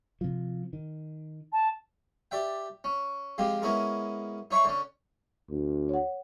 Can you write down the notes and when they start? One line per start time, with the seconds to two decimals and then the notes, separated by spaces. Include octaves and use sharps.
0.21 C3 F3
0.73 D#3
1.53 A5
2.31 G4 D5 E5 G5
2.84 C#4
3.38 F3 G#3 C4 F4 G4
3.62 G#3 B3 C#4 E4 G#4 A#4
4.51 D#4 C#5 E5 C6 C#6
4.64 D3 C#4
5.50 D2
5.89 C#5 F#5